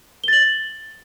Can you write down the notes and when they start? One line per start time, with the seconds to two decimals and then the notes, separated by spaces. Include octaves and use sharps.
0.24 G7
0.28 A6
0.33 F#7